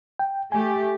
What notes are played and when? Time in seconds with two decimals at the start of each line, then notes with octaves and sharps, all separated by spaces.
0.19 G5
0.52 A3 G4 G#5